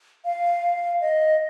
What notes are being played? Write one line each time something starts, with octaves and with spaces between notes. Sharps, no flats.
F5
D#5